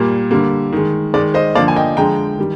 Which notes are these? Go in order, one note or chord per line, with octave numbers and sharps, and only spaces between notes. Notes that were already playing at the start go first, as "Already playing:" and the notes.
Already playing: A#2 G3 A#3
D3 G3 A#3
D#3 G#3
D#3 G#3 D5
C5 D#5
D3 F3 A#3 D5 F5
G#5
D#5 G5
D3 F3 G#3 G5 A#5
D#3 G3